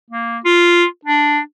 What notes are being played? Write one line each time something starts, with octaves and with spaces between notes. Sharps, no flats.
A#3
F4
D4